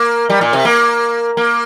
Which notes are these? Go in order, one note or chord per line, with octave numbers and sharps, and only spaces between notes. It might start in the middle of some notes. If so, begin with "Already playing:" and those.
Already playing: A#3
G3
A#2
C3
A#3
A#3